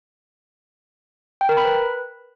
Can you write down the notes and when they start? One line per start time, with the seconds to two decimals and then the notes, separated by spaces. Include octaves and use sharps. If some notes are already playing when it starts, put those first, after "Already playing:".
1.41 G5
1.49 A#4
1.57 B5
1.65 B4